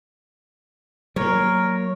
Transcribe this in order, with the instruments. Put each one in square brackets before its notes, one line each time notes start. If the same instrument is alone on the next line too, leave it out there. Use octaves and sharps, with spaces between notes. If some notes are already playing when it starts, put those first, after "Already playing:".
[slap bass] F#3 A#3 [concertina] A#4 [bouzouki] C#5